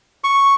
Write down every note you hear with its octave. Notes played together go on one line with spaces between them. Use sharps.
C#6